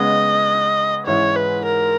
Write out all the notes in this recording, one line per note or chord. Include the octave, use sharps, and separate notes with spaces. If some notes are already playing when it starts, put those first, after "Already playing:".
Already playing: C#3 G#3 B3 D#5
G#2 E3 G#3 C#4 E4 C#5
B4
A#4